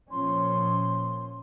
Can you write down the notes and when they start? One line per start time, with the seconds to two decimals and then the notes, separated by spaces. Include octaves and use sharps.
0.11 A#2 F3 C#4 C6